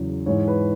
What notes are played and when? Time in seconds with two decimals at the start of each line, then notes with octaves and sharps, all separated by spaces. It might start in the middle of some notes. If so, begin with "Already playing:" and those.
Already playing: E2 C#3 F#3
0.26 G#2 E3 C#5
0.48 B4